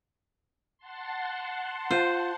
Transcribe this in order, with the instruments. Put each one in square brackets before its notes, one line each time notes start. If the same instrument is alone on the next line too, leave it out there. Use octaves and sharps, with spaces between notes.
[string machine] F#5 A5 C6
[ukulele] F4 [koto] C5